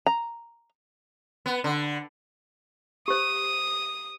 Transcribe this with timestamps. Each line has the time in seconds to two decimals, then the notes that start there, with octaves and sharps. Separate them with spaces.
0.06 A#5
1.46 B3
1.64 D3
3.08 G4 C5 D#6